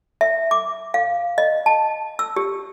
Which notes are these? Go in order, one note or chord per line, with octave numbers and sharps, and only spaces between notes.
E5
D6
F5
D#5
A5
E6
G4